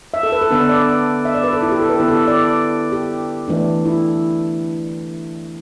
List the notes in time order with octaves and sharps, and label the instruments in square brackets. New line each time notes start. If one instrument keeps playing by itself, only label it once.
[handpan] E5
A4
B4
A4
D3 B3 D4 B4
D5
E5
D5
B4
A4
E4
G4
A4
B4
D3 B3 E4 G4
A4
D5
G4
E3 A3 D4
E4